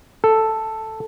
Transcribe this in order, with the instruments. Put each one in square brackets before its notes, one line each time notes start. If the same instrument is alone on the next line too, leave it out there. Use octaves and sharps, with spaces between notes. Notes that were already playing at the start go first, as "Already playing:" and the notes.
[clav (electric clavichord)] A4